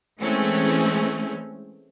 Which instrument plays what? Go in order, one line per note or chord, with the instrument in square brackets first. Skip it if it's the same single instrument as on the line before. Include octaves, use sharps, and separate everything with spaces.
[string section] E3 G#3 A3 C4 C#4